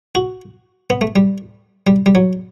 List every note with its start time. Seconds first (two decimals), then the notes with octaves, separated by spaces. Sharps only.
0.15 F#4
0.90 B3
1.01 A3
1.16 G3
1.87 G3
2.06 G3
2.15 F#3